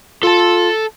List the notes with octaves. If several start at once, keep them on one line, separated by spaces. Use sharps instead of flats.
F4 A4 A5